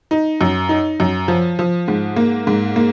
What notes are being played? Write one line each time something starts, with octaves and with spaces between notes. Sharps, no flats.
D#4
F#2
D#4
F#2
F3
F3
G#2
A#3
G#2
A#3